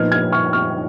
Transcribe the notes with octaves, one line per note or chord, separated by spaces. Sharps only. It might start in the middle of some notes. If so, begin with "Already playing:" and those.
Already playing: A#2 F3 B3 D#4 F6 G#6
F6 G#6
C#6 F6
C#6 F6